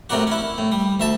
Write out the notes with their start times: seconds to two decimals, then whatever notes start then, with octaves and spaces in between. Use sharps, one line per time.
0.09 A2 C3 A#3 D4 F#4
0.27 C#4 E4
0.58 A2
0.72 G3
1.00 D2 E5 A5